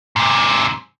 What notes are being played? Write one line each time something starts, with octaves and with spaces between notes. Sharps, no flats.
G#2 C3